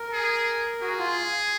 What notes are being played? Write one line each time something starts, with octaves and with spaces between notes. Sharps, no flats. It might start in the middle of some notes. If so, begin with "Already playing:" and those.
Already playing: A#4
G#4
F#4 G#4
F4